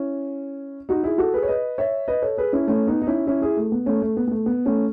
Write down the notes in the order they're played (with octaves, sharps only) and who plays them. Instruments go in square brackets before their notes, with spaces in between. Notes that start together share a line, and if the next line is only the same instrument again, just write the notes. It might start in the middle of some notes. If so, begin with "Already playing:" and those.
Already playing: [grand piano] C#4 E4
D#4 F#4
E4 G#4
F#4 A4
G#4 B4
C#5
B4 D#5
C#5 E5
B4 D#5
A4 C#5
G#4 B4
C#4 E4
A3 C#4
B3 D#4
D#4
C#4 E4
C#4 E4
E4 G#4
A3
B3
A3 C#4
A3
B3
B3
A3
B3
A3 C#4